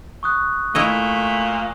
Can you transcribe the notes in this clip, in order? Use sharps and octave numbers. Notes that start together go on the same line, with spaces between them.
C#6 D#6 F#6
A#2 A3 E4 C#5 D#5